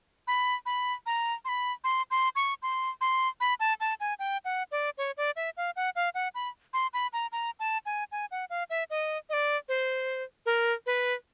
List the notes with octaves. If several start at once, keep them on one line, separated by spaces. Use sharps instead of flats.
B5
B5
A#5
C6
B5
C6
C6
C#6
C6
C6
B5
A5
A5
G#5
G5
F#5
D5
C#5
D5
E5
F5
F#5
F5
F#5
B5
C6
B5
A#5
A#5
A5
G#5
G#5
F#5
F5
E5
D#5
D#5
D5
C5
A#4
B4